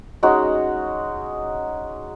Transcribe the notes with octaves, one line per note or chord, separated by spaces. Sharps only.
G#3 C#4 D#4 F#4